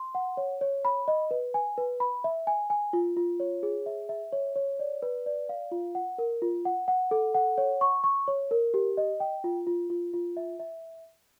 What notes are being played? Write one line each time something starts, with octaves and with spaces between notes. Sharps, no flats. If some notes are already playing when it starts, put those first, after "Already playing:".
Already playing: C6
F#5
C#5
C#5
B5
D#5
B4
G#5
B4
B5
E5
G#5
G#5
F4
F4
C#5
G#4
E5
E5
C#5
C#5
D5
B4
D5
F5
F4
F#5
A#4
F4
F#5
F#5
A4
F#5
C#5
C#6
C#6
C#5
A#4
G4
D#5
G5
F4
F4
F4
F4
E5
E5